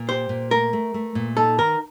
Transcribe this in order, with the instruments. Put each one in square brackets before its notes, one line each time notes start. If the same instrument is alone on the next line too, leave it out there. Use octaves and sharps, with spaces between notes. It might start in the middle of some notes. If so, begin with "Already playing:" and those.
Already playing: [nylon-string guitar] A#2
[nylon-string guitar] G4 [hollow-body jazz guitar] C5
[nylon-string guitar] A#2
[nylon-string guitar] A3 [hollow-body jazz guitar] A#4
[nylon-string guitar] A3
A3
A#2
[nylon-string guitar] D#4 [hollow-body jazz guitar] A4
[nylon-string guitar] D#3 [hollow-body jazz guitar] A#4